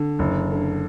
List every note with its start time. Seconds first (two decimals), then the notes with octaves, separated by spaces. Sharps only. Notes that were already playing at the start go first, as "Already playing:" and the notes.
Already playing: D3
0.19 F#1
0.51 D3